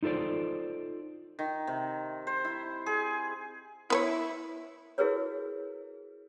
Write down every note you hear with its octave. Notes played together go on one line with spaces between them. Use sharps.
D#4 F4 A4 C5 D5
D#3
C3
C5
E4
G#4
B3 E4 B4 C#5
E4 F#4 G#4 A#4 B4 C#5